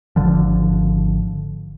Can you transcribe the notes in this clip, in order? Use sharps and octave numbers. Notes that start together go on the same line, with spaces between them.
G#1 D3 F3